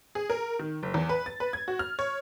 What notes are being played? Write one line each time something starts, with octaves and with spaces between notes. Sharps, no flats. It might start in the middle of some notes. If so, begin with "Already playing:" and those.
G#4
A#4
D#3
F#1
E2
B4
A6
B4
G#6
F#4
F6
C#5